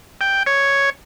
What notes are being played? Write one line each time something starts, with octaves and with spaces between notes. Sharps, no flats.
G5
C#5